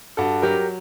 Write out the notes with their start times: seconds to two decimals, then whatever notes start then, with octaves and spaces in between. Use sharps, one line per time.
0.17 G2 F#4 A4
0.42 F#3 G4 A#4